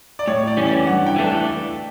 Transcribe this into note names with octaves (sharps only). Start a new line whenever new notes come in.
D5
A2 C#5
D5
E3 G3 C#4
D5
G2 F#5
G5
E3 A3 D4